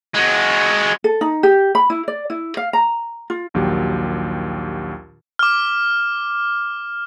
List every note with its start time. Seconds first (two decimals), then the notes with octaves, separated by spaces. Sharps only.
0.14 G#3 F#4
1.04 A4
1.21 D#4
1.43 G4
1.75 B5
1.90 E4
2.08 D5
2.30 E4
2.57 F5
2.73 A#5
3.30 F4
3.54 A#1 D#2 F#3 G4
5.39 D6 F6